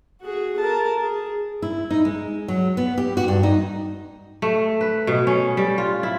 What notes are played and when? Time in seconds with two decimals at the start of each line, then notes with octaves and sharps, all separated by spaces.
0.22 F#4 G#4
0.59 A#4 A5
1.02 G#4
1.62 E4
1.90 D#4
2.05 G#3
2.48 F#3
2.77 B3
2.98 G4
3.17 F#4
3.28 G2
3.43 D#4
4.42 A3
4.81 B4
5.07 B2
5.27 C#4
5.57 G3
5.78 F4
6.03 E4